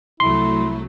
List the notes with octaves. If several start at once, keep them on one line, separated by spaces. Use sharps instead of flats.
C2 F#3 A3 E4 C6